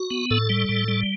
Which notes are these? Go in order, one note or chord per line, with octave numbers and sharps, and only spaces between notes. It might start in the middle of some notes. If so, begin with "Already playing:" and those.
Already playing: F#4
B3
A2 A4
G3
A2
G3